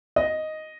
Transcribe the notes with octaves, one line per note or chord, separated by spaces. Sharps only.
D#5